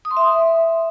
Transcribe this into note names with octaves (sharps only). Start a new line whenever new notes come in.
D#6
C6
E5